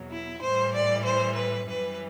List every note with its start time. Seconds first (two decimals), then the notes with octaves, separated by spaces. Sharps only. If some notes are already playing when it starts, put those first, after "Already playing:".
Already playing: E2 B2 F#3
0.11 E4
0.42 A2 E3 G3 C5
0.74 D5
1.05 C5
1.36 B4
1.68 F#2 E3 G3 B4